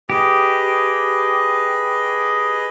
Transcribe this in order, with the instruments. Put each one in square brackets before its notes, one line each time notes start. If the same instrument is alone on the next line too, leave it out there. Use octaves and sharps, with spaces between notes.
[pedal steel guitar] G4 [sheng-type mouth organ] G#4 B4 D#5